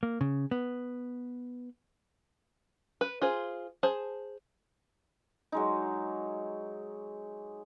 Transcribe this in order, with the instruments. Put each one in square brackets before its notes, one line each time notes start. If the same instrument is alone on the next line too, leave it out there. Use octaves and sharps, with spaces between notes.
[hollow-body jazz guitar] A#3
C#3
B3
[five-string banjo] B4
F4 G#4 C5
G#4 C5 A5
[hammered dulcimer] F#3 G#3 D#4